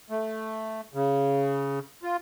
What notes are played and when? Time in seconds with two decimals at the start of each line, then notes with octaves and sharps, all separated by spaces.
0.10 A3
0.93 C#3
2.03 F4